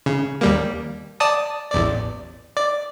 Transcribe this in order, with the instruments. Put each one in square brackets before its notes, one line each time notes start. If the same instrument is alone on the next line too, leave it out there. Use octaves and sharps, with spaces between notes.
[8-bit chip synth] C#3
D#2 G3 A#3
D5 A5 D#6
A1 E2 D5
D5